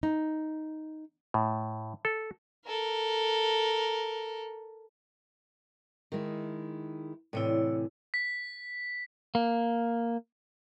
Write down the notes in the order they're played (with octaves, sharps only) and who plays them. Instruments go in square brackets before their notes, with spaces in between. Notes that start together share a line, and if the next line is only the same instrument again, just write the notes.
[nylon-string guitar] D#4
[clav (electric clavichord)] A2
A4
[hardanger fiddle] A4 A#4
[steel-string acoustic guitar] D#3 G#3 E4
[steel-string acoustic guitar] A2 C3 E3 [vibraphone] E4 C#5 D5
[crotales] B6
[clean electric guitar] A#3